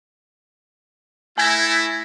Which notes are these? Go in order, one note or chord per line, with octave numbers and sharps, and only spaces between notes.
A3 E4 G#5 G#6 A#6